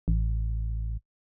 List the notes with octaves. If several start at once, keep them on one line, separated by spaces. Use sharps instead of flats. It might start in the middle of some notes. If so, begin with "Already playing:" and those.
A1